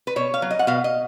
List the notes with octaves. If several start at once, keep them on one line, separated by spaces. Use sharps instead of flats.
B4
B2 C#5
F5
F#3
D#5
F#5
B2 F5
D#5